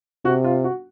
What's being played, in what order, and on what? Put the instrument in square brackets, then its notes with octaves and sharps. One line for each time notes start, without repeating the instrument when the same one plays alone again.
[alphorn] C3 [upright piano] F#4
[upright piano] F4
F#4